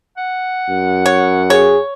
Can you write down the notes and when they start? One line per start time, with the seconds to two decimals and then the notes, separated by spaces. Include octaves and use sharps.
0.17 F#5
0.69 F#2
1.06 C#5
1.50 G#4 C#5